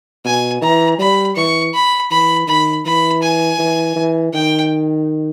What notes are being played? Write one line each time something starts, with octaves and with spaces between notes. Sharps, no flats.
B2 G#5
E3 A#5
G3 B5
E3 C#6
B5
E3 B5
D#3 B5
E3 B5
G#5
E3
E3
D#3 G5